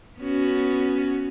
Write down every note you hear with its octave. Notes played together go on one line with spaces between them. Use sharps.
B3 C#4 F#4